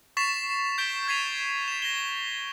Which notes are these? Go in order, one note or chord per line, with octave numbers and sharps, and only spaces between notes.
C#6 A6 B6 C7 E7 F7
G6 B6 D7 G7
G6 G#6 B6 C7 D#7 F7
B6 E7
A#6 E7 G7